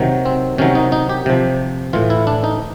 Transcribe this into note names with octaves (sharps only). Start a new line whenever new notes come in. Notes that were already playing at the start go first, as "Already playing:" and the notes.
Already playing: C3 D#3 F#3
C4
C3 D#3 F#3 C#4
D#4
D#4
G4
C3 F3
A2 E3 F4
E4
D4
D#4